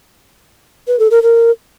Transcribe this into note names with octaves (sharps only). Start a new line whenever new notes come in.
B4
A4
A#4
A#4